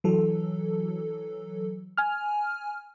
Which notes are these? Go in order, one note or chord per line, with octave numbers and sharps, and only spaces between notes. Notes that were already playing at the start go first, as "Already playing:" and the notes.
E3 F#3 A4
G#5 F6